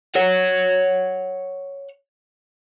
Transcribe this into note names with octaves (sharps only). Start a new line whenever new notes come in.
C#5 F#5